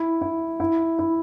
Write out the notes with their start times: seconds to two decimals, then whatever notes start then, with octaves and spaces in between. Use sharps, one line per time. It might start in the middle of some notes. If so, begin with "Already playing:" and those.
Already playing: E4
0.22 E4
0.60 E4
0.99 E4